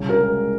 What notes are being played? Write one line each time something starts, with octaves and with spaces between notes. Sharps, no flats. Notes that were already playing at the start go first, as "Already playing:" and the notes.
Already playing: C2 C#3
A#4
G#3